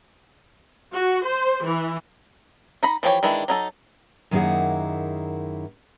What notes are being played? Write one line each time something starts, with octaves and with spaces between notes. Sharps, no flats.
F#4
C5
E3
D#4 A#5 B5
E3 F3 G4 G#4 C#5
D#3 E3 G#3 D4 E4
F#3 D#4 A4
F#2 D#3 A#3 E4 G#4 F#5